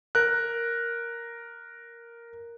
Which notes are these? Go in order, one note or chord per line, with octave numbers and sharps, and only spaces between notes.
A#4 F#6